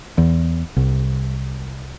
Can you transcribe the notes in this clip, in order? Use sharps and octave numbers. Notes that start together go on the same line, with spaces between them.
E2
C2